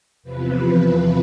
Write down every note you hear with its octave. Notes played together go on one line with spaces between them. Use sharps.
E2 C3 F3 B4